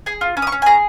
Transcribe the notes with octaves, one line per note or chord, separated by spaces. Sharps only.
G#4 G#5
F4
C#4
D#6
C#6
C#4
G#5
G#4 A#5